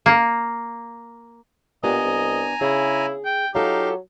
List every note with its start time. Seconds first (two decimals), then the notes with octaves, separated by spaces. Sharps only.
0.06 A#3
1.84 A#2 B3 D4 G4 D#5 G#5 A#5
2.05 C2
2.61 C#3 E4 G#4
3.25 G5
3.55 F#3 D#4 F4 G4 A4 F5